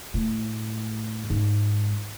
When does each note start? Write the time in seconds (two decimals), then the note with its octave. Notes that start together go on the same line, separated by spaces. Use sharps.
0.14 A2
1.30 G#2 G#3